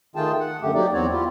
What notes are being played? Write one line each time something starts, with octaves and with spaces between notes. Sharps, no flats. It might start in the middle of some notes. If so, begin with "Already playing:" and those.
D#3 A3 F4 G#4 G5 A5
F#5
F#2 D3 A3 G4
F#3 A#3 D#4 G4 D5
E2 C4 F#4 C#5 D5
E4 F4 G4